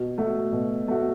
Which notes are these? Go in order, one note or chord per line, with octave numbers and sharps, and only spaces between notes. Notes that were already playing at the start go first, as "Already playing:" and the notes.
Already playing: B2
A3 F#4
B2
A3 F#4